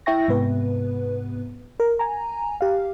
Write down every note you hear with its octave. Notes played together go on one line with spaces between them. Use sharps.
E4 E5 G5 C#6 A#6
G#2 C3 B3 B4
A#4
G#5 A#5
G4 F5